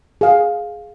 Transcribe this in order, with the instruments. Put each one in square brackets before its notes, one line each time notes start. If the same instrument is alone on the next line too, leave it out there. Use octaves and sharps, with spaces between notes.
[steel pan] G#4 F5